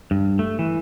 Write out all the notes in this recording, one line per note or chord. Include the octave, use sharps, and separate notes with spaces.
G2
A3
E3